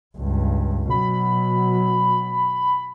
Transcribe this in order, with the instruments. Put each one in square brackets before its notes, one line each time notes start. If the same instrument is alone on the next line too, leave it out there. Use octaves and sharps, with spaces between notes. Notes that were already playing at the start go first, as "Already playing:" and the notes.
[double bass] C#2 G2
[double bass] B2 F#3 [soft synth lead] B5